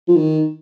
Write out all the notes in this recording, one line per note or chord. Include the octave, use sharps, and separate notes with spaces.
F3
D#3